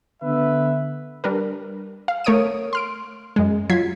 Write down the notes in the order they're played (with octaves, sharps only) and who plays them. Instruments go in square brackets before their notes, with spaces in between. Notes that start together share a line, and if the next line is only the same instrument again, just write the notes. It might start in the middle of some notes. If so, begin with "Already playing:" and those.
[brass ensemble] D3 B3 B4 E5
[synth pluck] G3 D4 A#4 B4
F5
A3 A#4 C#5 D#6 D7 D#7
C6 F6 D7
F#2 G#3
F#3 F4 G#6 B6 C7